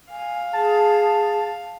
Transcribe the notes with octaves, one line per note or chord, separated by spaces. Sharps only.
F5 G#5
G#4 A5